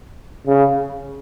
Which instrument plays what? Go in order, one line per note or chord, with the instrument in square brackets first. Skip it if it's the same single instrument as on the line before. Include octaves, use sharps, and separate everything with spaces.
[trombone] C#3